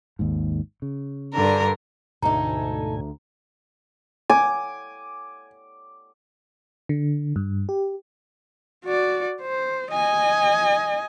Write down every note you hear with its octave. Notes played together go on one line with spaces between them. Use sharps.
G#1 D#2 G#2
C#3
G2 D3 A#4
D2 G#2 B2 D#4 A4 G#5 A#5
G#5 D6
D3
G2
G4
F#4 D5
C5
D#5 G#5